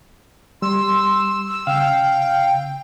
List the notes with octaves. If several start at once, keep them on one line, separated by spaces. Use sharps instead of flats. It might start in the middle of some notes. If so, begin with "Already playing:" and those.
G3 C6 E6
C#3 F5 G5 E6